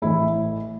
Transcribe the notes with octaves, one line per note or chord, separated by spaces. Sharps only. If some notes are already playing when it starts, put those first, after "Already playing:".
A1 A2 E3 E4